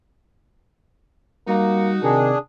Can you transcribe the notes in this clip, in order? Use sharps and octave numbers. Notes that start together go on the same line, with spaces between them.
G3 A#3 D#4 F#4
C3 D#3 D4 G#4